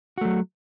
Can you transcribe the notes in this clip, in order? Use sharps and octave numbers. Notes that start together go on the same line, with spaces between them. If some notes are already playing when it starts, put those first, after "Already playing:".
F#3 A3 F#4